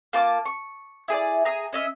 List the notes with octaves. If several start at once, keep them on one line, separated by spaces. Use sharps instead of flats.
A#3 F4 A5 D6
C#6
E4 G#4 C5 D5
G#4 A#5
C#4 D#5 E5